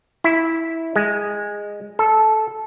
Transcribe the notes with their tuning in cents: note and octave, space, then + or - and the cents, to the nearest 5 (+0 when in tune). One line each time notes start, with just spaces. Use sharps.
E4 -10
G#3 -10
A4 -15